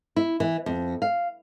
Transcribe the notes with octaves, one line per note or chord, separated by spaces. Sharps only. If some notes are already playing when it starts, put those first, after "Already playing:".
E4
E3
F2
F5